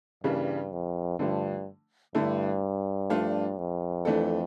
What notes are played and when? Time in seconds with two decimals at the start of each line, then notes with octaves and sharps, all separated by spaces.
0.24 G2 C#3 E3 G3 A#3 D4
0.72 F2
1.19 G2 D3 F3 A3
2.15 G2 D3 A3 E4
3.10 F3 A3 D4 F4
3.58 F2
4.05 E3 A3 D4 A4